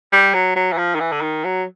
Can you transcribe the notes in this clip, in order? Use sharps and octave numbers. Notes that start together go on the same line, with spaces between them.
G3
F#3
F#3
E3
F3
D#3
E3
D3
D#3
F#3